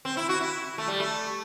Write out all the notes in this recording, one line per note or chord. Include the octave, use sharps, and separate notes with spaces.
C4
E4
F#4
E4
A3
G3
A3